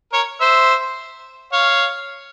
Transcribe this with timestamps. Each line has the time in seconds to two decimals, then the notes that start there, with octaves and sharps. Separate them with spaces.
0.13 A#4 C#5
0.40 C5 E5
1.53 C#5 F5